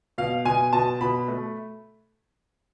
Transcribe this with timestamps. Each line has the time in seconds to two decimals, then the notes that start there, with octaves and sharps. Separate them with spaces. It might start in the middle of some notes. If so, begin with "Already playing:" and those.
0.18 B2 F5
0.45 B2 G#5
0.73 B2 A5
1.00 B2 B5
1.28 A3